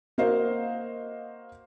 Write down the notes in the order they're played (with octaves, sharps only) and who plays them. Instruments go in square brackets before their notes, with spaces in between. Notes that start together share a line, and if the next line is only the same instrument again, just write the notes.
[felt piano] A#3 F#4 A#4 C5 D#5 F5